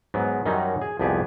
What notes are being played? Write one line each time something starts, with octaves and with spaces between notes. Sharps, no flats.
G#2 F#3 B3
F#2 D#3 F#3 G3 C#4 D#4
G#4
C2 F2 B3 G4 G#4